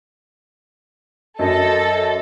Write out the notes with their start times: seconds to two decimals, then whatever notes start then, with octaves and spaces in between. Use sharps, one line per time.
1.39 F#2 A4 D#5